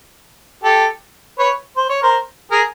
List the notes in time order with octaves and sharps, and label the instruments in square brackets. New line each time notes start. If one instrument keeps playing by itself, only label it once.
[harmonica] G4 A4
B4 C#5
C5
C#5
A#4 C5
G#4 A#4